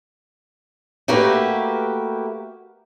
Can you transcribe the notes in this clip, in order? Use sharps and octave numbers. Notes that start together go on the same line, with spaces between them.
A3 A#3 F#4 G4 A#4 B4